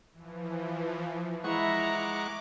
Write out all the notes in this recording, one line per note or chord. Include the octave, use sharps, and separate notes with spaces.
E3 F3
G#3 E4 E5 F#5 A#5 C#6 D6